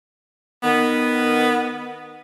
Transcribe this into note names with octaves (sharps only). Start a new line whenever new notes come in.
D#3 B3